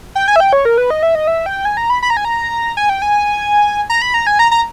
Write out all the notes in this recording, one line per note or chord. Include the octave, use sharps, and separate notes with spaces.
G5
G#5
E5
G5
C#5
A#4
B4
D#5
E5
D#5
E5
G5
G#5
A#5
B5
B5
A#5
G#5
A#5
G#5
G5
G#5
A#5
B5
A#5
G#5
A#5
A#5